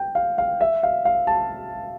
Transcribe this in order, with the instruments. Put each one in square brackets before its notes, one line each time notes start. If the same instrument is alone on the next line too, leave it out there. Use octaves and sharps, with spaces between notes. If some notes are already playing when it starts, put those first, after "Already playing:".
Already playing: [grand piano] G5
F5
F5
E5
F5
F5
A5